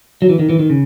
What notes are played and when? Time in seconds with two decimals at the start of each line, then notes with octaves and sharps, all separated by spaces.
0.22 F#3
0.29 E3
0.39 D#3
0.50 E3
0.59 D#3
0.70 C#3